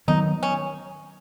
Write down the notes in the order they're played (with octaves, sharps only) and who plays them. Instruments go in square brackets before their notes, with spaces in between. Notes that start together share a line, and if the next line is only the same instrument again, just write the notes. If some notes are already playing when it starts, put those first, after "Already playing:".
[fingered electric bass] D#3 F#3 B3 [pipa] D#4
[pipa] C#4